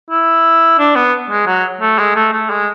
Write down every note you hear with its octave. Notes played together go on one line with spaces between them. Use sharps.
E4
D4
B3
G#3
F#3
A3
G#3
A3
A3
G#3